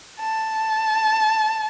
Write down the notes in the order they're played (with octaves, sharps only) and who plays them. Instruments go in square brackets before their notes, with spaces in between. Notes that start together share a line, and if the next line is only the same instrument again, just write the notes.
[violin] A5